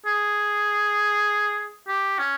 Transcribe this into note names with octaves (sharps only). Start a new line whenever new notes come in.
G#4
G4
C#4